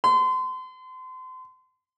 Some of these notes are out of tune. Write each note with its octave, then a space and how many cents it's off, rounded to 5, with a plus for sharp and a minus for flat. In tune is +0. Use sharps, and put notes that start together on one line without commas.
C6 -35